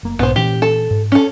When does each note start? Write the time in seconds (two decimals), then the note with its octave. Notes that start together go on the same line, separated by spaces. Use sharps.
0.03 F#1 A#3
0.19 B1 G#2 B3 C5
0.36 A#2 E3 C#4 G4
0.62 A4
0.91 G#2
1.12 C#4 A4